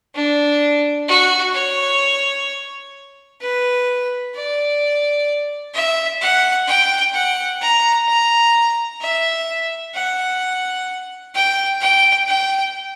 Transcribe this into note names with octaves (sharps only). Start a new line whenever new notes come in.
D4
F#4
C#5
B4
D5
E5
F#5
G5
F#5
A#5
A#5
E5
F#5
G5
G5
G5